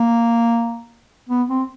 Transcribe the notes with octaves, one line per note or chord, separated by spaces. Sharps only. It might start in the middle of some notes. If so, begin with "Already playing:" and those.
Already playing: A#3
B3
C4